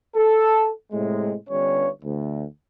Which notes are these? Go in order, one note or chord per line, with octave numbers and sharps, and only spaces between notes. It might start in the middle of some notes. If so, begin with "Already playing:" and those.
A4
A2 C3 G#3
G1 G2 C#4 C#5
D2